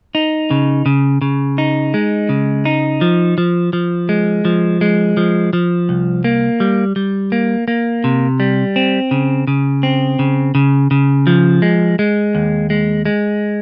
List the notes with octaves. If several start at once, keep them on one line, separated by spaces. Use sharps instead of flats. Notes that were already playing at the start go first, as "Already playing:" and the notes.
D#4
C#3
C#3
C#3
D#4
G#3
C#3
D#4
F3
F3
F3
G#3
F3
G#3
F3
F3
C2
A#3
G3
G3
A#3
A#3
C3
G3
C4
C#3
C#3
C4
C#3
C#3
C#3
F3
G#3
G#3
D#2
G#3
G#3